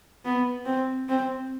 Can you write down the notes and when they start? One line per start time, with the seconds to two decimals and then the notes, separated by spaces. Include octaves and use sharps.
0.25 B3
0.66 C4
1.09 C4